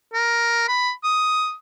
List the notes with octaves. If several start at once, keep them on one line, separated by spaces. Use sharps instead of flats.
A#4
B5
D#6